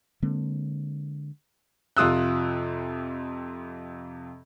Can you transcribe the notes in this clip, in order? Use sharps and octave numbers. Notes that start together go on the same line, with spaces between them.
D3 G#3 A#3 C4
F2 C3 F4 D#6 E6 F#6